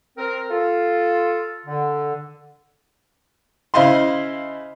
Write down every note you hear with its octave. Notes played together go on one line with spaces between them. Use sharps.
C4 A#4
F4 A4
D3
C#3 E4 C5 D#5 F5 C6